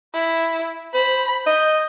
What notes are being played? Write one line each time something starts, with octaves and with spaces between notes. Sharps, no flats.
E4
C5 B5
D#5 G6